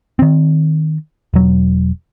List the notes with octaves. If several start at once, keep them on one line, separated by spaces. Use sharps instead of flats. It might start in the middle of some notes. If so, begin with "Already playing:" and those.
D#3 C4
E1 F#3